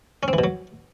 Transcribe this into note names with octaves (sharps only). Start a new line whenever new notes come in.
C#4
C4
E3
B2
F#3